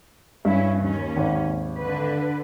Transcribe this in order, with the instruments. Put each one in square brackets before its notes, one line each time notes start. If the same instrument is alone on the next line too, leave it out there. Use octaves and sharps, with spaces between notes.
[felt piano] G2 [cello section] C#4 E4
[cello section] D#2 C#4
[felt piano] G#1
[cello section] D3 B4